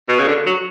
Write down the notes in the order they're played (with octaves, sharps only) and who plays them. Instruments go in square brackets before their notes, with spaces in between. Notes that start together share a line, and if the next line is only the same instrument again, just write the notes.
[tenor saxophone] B2
C#3
D3
F#3